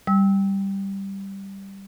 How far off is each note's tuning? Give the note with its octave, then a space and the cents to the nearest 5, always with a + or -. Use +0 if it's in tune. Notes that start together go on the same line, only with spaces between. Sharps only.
G3 +0 E6 -25